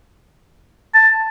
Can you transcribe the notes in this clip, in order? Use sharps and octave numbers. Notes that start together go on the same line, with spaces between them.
A5